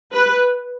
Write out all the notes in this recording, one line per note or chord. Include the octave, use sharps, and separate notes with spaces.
B4